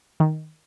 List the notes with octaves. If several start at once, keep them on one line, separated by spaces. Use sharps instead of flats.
D#3